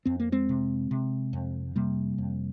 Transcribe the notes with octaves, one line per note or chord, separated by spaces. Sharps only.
F2 C4
A#3
G#3 C4
C3
C3
F2
C3 G3 A#3
F2